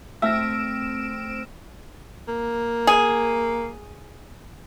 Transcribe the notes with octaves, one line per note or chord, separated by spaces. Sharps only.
A3 C4 E5 E6 F6 A#6 D7 E7
A#3
G#4